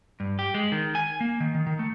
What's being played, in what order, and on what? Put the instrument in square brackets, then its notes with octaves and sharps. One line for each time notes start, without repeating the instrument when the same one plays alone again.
[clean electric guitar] G2
G4
G#3
D#3
G#5
A#3
D#3
D#3
D#3
A3